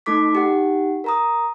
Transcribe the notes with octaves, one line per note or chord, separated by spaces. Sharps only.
A3 D#4 A4 D6 B6
D#4 G4 F#5
A#4 A#5 D#6